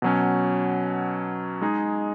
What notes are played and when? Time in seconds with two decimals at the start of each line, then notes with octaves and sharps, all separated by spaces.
0.02 B2 F#3 C#4
1.61 G#3 D#4 G#4